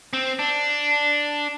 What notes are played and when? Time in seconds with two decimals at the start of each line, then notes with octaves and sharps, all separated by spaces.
0.13 C4
0.39 D4